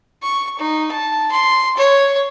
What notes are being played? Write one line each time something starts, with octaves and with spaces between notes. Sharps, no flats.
C#6
D#4
A5
C6
C#5